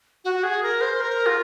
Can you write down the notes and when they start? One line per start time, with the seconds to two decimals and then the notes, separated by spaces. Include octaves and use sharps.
0.25 F#4
0.43 G#4
0.63 A#4
0.81 C5
1.01 A#4
1.26 F4